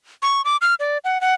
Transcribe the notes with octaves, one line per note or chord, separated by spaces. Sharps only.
C#6
D6
F6
D5
F#5
F#5